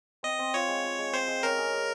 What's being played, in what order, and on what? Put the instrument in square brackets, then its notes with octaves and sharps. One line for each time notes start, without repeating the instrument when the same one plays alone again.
[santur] C4 [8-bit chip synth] D#5
[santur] C4
[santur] F4 [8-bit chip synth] C#5
[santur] G#3
F4
G#3
[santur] C4 [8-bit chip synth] C5
[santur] G#3
[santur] C#4 [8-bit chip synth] A#4
[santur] G#4
G#4